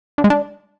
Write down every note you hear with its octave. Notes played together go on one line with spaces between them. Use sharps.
D3
G#3
D4